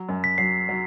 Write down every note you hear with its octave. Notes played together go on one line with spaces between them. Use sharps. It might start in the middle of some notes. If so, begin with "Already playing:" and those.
Already playing: F#3
F#2
B6
F#3 C7
F#3